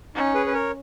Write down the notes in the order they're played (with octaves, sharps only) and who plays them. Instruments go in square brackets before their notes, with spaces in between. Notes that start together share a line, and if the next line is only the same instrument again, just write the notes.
[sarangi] C#4 [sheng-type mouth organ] D#4
[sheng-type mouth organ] G#4 B4
B4
A#4 C#5